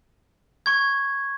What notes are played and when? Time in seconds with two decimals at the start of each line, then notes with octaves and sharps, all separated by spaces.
0.66 C#6 G#6